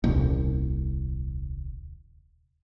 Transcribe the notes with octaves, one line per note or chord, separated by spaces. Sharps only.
D#1 C2